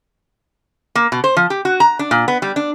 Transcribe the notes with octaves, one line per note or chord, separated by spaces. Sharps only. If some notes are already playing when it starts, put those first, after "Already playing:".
A#3
B2
C5
F3
G4
F#4
A#5
D4
A#2
B3
G3
D4